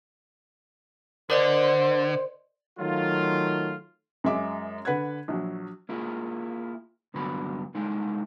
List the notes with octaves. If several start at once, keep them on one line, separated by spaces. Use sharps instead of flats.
D3 A#4 C5 D5 D#5
D#3 F#3 A3 F4
F#2 G#3 E5 D6
D3 B4 F#5 F#6 G#6
A#1 F#3
A#3 E4 F4 G#4
C2 G2 D3 F#3 B3 B5
C2 G#3 D#4 E4